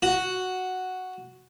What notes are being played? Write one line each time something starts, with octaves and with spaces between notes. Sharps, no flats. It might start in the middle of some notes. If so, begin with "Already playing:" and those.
F#4